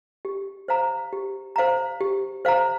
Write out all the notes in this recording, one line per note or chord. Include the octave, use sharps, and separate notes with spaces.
G4
C5 F5 A#5
G4
C5 F5 A#5
G4
C5 F5 A#5